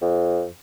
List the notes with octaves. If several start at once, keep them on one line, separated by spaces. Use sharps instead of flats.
F2